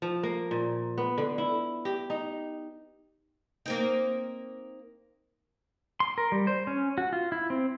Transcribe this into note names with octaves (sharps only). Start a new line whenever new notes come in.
F3
A#3
A#2
B3
D3
E4
G4
D#4
A#3 C4 D#4
C6
A#4
G3
C5
C#4
F#4
F4
E4
C4